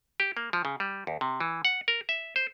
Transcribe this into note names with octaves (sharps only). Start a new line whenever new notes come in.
G4
A#3
F3
C#3
G3
D#2
C3
E3
F#5
A#4
E5
C5